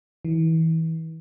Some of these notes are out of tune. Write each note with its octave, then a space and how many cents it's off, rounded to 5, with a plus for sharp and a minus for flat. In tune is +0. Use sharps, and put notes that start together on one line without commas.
E3 -30